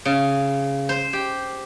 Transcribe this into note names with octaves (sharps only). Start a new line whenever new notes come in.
C#3
C5
G4